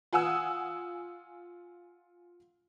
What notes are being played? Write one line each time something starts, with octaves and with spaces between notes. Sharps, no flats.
F4 F#5 G#5 D#6 E6